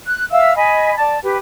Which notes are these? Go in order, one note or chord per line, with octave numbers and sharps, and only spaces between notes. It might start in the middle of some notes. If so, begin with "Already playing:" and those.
F#6
E5 F5 E6
D#5 G#5 B5
D5 A5
G4 B4